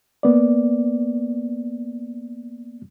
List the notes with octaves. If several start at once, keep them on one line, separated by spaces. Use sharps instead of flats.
A#3 B3 D5